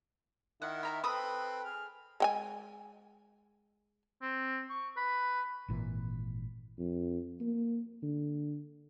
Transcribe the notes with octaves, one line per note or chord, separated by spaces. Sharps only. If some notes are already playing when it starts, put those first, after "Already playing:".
D#3 E4 F#5
E5 A#5 B5
C4 A4 B4 B5 D#6 E6
G#4 F6
G#3 G5 G#5
C4
C#6
B4
G#1 A#2 E3
F2
A#3
D3